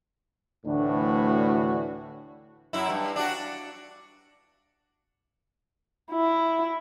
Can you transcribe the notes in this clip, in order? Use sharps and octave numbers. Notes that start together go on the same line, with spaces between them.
D2 A2 E3 D4 F#4
F#2 E4
G2
D4 F#4
E4